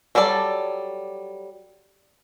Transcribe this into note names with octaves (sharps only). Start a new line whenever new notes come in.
F#3 G3 A4 D5 A5